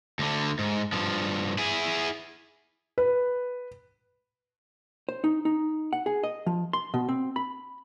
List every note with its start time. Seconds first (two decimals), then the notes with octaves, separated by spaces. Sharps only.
0.19 D2 D3
0.59 G#2
0.93 G2 F3
1.58 E4 G#4
2.98 B4
5.09 C5
5.24 D#4
5.45 D#4
5.93 F#5
6.06 G#4
6.24 D#5
6.46 F3
6.73 C6
6.94 B2
7.09 C4
7.36 B5